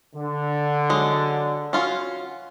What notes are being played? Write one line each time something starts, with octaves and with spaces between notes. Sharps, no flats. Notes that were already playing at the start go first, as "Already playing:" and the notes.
D3
F#3 G#3
C#4 F4 F#4